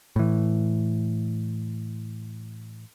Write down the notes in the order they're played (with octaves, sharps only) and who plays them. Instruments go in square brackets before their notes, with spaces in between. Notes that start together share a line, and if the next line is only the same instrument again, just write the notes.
[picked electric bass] A2 E3